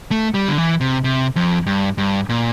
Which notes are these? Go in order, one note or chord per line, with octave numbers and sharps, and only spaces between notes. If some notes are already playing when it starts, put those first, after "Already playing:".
A3
G3
D3
E3
C3
C3
F2
G2
G2
A#2